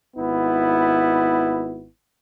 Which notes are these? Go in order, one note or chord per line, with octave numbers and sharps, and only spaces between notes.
G#1 B3 E4